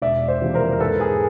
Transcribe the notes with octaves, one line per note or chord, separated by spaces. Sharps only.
E1 D5 E5
C5 D5
E2 C3 F3 A#3
A#4 C5
A#4
G#2 A4 B4
G#4 A#4